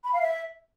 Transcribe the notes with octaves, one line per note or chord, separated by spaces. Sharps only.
B5
F5
E5